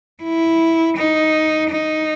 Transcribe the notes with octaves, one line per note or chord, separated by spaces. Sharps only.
E4
D#4
D#4